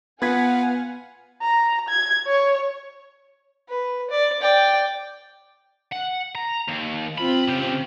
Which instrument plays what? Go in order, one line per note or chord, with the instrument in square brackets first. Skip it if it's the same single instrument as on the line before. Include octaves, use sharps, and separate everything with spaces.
[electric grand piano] B3 G#6 B6 [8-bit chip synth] F4 B4 [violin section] F5 F#5 G#5
[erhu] A#5
G#6
C#5
[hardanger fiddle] B4
D5
D5 G5
[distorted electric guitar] F#5
A#5
D#2
[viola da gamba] C4 F4 [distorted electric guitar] B5
[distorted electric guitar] C#3 G4